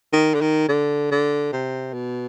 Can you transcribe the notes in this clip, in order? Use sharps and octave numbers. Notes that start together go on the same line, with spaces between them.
D#3
D3
D#3
D3
D3
C3
B2